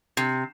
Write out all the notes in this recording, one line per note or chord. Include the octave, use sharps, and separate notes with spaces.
C3